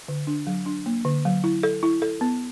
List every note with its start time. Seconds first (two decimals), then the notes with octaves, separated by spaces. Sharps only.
0.08 D3
0.27 D4
0.47 F#3
0.66 D4
0.86 A#3
1.05 D3
1.25 F#3
1.44 E4
1.63 A4
1.83 E4
2.02 A4
2.21 B3